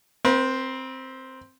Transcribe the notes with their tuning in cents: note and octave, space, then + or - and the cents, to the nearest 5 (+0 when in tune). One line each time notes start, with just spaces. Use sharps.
C4 +0 B4 -45